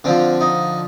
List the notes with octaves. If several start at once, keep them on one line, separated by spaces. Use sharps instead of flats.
D3 F3 C4
D#4